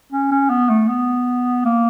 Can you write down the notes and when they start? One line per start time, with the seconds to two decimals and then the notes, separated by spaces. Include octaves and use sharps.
0.12 C#4
0.31 C#4
0.50 B3
0.69 A3
0.88 B3
1.65 A#3